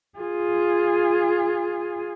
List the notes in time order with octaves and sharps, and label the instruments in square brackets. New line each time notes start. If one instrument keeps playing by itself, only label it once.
[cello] F4 G#4